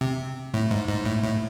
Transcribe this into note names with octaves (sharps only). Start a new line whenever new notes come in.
C3
A2
G#2
G#2
A2
A2